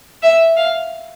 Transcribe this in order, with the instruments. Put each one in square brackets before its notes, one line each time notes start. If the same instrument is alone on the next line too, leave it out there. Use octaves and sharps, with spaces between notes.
[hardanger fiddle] E5
F5